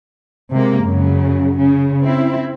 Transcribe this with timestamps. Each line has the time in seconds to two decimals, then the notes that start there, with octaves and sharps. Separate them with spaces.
0.51 C3 G#3 A#3
0.85 F#2 C#3 F#3
1.57 C#3
2.03 C4 E4